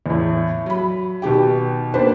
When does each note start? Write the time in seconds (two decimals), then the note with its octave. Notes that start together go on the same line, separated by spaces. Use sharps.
0.06 E2 A2
0.66 F#3 B5
1.22 B2 D#3 G4 G5
1.94 A#3 B3 D4 F#4 B4 C5